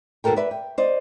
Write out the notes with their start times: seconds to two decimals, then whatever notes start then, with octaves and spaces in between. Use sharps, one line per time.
0.24 D#2 B2 F#4 A4 A#4 G5
0.36 B4 D5 E5
0.51 G5
0.78 C5 D5 D#5